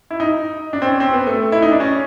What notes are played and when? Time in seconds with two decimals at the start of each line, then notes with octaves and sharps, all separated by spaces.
0.11 E4
0.20 D#4
0.73 D4
0.82 C4
0.87 C#4
1.00 C4
1.14 B3
1.27 A3
1.52 E4
1.62 D#4
1.71 D4
1.80 C#4